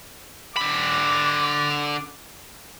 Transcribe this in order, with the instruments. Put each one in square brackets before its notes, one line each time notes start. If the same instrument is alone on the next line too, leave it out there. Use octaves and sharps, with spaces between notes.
[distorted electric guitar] D3 B5 [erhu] D6